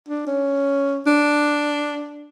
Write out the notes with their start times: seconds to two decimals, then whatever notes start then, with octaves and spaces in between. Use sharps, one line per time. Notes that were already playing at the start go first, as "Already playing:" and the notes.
0.09 D4
0.27 C#4
1.07 D4